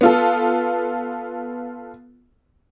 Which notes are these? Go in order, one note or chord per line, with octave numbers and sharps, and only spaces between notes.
B3 F4 A4